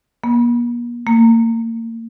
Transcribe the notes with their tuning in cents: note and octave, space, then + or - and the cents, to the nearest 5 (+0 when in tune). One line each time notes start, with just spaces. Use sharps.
A#3 +45
A#3 -35